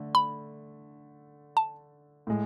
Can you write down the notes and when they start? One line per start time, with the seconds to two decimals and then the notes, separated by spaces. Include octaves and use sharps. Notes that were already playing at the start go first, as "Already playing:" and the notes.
Already playing: D3 A3
0.15 B5
1.57 A5
2.27 A2 G#3